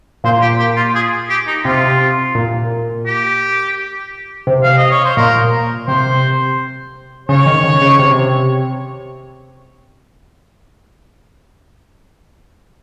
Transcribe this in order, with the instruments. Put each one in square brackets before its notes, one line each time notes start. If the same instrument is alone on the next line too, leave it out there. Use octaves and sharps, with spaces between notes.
[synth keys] A#2 [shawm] C5
[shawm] G4
G4
F4
G#4
G4
D#4
[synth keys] C3 [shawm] F4
[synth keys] A#2
[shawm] G4
[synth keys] C3
[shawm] F5
D#5
C#5
C5
[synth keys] A#2 [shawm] A#4
[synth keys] C3 [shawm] C5
[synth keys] C#3 [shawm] C#5
[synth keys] D#3
C#3
C#3
C3